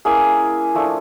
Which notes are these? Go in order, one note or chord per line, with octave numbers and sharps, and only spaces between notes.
A#3 C#4 E4 G#4 G#5
F3 A3 D4 F4